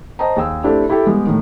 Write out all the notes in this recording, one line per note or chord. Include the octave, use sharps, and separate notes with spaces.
C5 D#5 G5 A5 A#5
D#2 G#4 G5 E6
A3 C4 D4 E4 G4
E4 G4 A4 G5
G3 G#3 B3 G4
A2 D#3